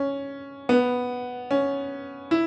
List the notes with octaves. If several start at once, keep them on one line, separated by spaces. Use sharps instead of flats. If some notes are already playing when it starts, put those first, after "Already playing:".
Already playing: C#4
B3
C#4
E4